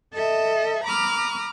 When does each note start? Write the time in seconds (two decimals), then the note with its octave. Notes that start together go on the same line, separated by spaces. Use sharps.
0.14 A4 D#5 E5
0.85 A#5 B5 D6 D#6 F6